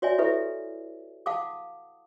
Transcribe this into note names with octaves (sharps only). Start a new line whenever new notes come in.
F#4 C#5 D5 E5 G#5
E4 G4 A4 B4 E5
F5 F#5 A5 D6 D#6